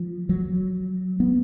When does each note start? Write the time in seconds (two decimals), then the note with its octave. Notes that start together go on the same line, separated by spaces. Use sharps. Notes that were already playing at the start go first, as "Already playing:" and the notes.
Already playing: F3
0.29 F#3
1.20 B3